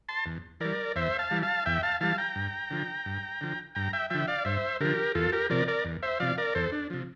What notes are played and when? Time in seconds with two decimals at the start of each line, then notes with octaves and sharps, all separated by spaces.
0.09 A5 C6
0.26 E2
0.60 E3 G3 A#4 D5
0.96 E2 C5 E5
1.19 F5 A5
1.31 E3 G3
1.43 F5 A5
1.66 E2 E5 G5
1.83 F5 A5
2.01 E3 G3 F5 A5
2.18 G5 A#5
2.36 G2
2.71 D3 F3
3.06 G2
3.41 D3 F3
3.75 G2 G5 A#5
3.93 E5 G5
4.10 D3 F3 E5 G5
4.28 D5 F5
4.45 G2 C5 E5
4.80 D3 F3 G4 A#4
5.15 E2 F4 A4
5.32 G4 A#4
5.50 C3 F3 A#4 D5
5.68 A#4 D5
5.85 E2
6.03 C5 E5
6.20 C3 F3 D5 F5
6.38 A#4 D5
6.55 E2 A4 C5
6.72 D4
6.90 C3 F3